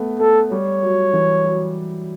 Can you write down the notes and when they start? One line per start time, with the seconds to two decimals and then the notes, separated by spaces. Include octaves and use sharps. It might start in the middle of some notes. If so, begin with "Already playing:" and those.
Already playing: A3 B3
0.19 A3 A4
0.51 G3 C#5
0.83 F#3
1.13 E3
1.45 F#3